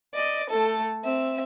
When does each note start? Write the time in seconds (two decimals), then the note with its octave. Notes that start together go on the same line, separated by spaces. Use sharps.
0.14 D5 D#5
0.50 A3 A4
1.04 C4 E5